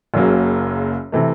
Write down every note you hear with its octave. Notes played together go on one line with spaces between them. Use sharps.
F#1 F#2 C#3 F#3 A#3
C3 E3 A3